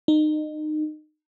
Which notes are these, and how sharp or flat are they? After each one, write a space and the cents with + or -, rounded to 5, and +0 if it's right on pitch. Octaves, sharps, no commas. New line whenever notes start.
D#4 -25